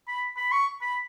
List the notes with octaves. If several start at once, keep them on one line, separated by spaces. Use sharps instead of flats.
B5
B5
C#6
B5